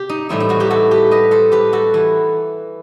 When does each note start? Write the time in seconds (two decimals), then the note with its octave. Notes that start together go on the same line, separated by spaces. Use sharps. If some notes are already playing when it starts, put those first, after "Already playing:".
Already playing: C3 G4
0.09 D#4
0.29 A2 E3 G3 C4 D#4 E4
0.40 E4
0.49 D#4 F#4
0.60 E4 G4
0.70 F#4 A4
0.91 G4 B4
1.11 B4 D#5
1.31 A4 C5
1.52 G4 B4
1.73 F#4 A4
1.94 E3 E4